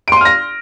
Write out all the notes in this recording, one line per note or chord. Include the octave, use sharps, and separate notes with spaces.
C6 F6 A#6 D7 D#7